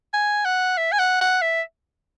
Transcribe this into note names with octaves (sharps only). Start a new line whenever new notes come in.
G#5
F#5
E5
G#5
F#5
F#5
E5